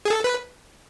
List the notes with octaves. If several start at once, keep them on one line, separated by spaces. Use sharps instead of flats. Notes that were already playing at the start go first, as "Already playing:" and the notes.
G#4
A4
B4